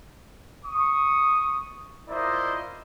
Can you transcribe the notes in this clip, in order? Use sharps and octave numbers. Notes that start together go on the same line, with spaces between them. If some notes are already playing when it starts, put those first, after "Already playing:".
C#6 D#6
E4 F4 A#4 C5 D5 D#5